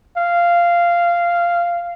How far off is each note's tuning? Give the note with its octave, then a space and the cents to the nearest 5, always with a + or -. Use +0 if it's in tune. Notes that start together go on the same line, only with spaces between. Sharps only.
F5 -10